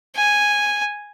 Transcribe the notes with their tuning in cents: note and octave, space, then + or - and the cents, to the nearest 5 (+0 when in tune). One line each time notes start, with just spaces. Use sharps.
G#5 -5